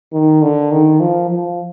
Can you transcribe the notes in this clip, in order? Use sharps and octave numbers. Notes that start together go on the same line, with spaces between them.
D#3
D3
D#3
F3
F3